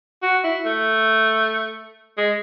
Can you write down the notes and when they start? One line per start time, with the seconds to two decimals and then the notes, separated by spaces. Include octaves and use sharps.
0.22 F#4
0.44 E4
0.65 A3
2.18 G#3